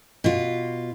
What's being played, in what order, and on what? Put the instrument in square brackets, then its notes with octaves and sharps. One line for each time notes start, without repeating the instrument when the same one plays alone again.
[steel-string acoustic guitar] B2 F4